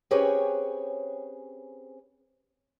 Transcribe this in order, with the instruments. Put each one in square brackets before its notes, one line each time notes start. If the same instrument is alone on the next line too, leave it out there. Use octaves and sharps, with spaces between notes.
[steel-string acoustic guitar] C4 C#4 G4 G#4 B4 C#5